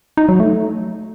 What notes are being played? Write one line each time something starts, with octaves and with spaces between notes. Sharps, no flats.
D#4
F#3
A3